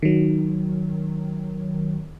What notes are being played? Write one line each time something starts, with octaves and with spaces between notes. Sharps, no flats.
D#3 F#3